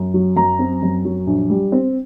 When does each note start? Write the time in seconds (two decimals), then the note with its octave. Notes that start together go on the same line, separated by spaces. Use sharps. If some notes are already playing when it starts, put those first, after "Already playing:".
Already playing: F#2
0.14 F#3
0.36 F#2 A#5
0.59 C4
0.82 F#2
1.05 F#3
1.27 A#1
1.50 G3
1.72 C4